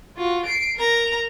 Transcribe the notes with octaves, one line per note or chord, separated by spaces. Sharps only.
F4 F#4
C7 D7
A#4 A#5